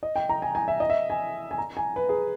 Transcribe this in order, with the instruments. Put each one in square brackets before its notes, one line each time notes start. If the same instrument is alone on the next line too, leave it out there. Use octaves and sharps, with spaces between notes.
[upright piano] D#5
G5
A#5
G#5
G#5
E5
D#5
E5
G#5
G#5
A#5
G#5
B4
G#4